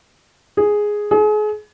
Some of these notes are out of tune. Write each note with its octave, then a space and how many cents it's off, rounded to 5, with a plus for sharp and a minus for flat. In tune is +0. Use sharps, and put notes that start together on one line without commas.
G#4 +0
G#4 +35